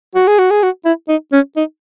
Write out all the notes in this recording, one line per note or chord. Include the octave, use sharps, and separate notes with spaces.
F#4
G#4
F#4
G#4
F#4
E4
D#4
C#4
D#4